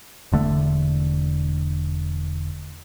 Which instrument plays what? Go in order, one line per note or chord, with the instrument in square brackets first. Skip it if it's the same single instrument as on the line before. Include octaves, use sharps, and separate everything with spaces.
[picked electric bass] E1 D3 A3